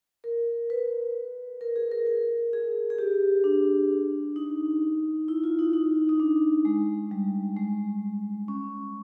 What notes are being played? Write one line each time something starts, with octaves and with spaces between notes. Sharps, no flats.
A#4
B4
A#4
G#4
A#4
A#4
G#4
G#4
G4
D4
D#4
E4
F4
D#4
D#4
D#4
D4
G#3
G3
G#3
C#4